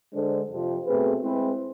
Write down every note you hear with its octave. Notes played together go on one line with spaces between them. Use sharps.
D3 G#3 D4 A4 C5
F2 C3 F3
B2 A3 C4 G#4 B4
G#3 C4 E4 B4